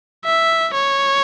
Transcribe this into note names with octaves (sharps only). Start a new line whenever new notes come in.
E5
C#5